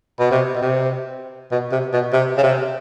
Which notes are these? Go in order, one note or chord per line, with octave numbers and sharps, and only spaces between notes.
B2
C3
B2
C3
B2
C3
B2
C3
C#3
C3